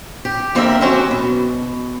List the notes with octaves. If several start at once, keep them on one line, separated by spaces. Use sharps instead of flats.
G4
F2 D3 A#3 C4 A#4 E5
F#3 C4 C#4 F#4 G4
B2